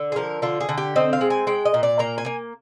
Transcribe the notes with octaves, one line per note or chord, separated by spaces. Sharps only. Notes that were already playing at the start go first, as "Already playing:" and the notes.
Already playing: D3
G#4
F3 A#4
D3 F4
G#4
D3
G4
C4 D#5
F5
G#3
G#5
G#3 G5
D#5
A#2
D5
A#3 A#5
G#5
A#3